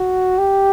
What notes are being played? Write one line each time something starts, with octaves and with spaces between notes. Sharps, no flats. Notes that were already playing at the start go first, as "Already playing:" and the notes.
Already playing: F#4
G4